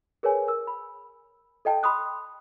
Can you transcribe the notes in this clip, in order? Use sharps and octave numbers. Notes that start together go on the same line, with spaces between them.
G#4 A#4 B4 C#5 G#5
A#4 E6
B5
A4 D#5 G5 A5
B5 C6 D#6 F#6